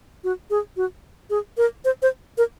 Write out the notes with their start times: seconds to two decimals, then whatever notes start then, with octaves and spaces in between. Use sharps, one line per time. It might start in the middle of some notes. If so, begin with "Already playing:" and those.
0.24 F#4
0.50 G#4
0.77 F#4
1.30 G#4
1.57 A#4
1.85 C5
2.02 C5
2.38 A#4